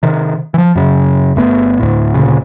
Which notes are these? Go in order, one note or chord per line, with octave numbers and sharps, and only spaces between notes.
C3 D#3
E3 F3
F#2 C#3
G1 A3 B3
D2 A2
D2 A#2 C#3